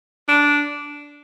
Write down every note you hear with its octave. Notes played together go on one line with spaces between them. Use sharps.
D4